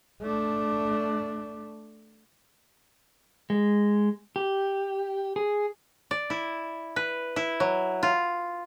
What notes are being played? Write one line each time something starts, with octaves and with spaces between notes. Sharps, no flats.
A3 D4
G#3
G4
G#4
D5
E4
B4
E4
F#3
F4